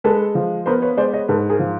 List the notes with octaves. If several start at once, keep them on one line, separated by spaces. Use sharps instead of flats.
G#3 A4 B4
F3
B3 A#4 C5
B4 C#5
G#3 C5 D5
C#5 D#5
G#2 A4 B4
G#4 A#4
F3